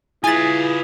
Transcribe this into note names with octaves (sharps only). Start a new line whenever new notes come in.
E4 F4 G#4 B4 G#5 A6